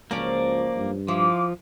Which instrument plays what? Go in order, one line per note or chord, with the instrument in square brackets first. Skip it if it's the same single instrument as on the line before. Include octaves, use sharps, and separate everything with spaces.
[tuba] C#2 [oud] F3 F#3 C#4 [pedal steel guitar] A#3 D5
[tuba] G2
[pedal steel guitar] F3 [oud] E4 [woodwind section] F5 C6 D6